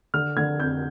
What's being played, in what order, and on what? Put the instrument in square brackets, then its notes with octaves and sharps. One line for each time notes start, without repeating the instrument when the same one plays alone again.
[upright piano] D3 F6
D3 G#6
F2 G6